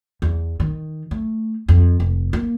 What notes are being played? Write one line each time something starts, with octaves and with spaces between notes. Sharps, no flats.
E2
D#3
A3
F2
F1
A#3